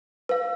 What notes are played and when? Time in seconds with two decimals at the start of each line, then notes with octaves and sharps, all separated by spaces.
0.29 B4 F5